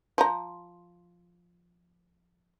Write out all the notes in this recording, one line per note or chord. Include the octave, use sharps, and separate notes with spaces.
F3 A#5